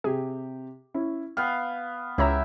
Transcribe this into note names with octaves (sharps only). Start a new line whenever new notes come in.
C3 G4 G#4
C#4 E4
B3 F5 G5
C#2 E4 G4 C#5 E5 A#5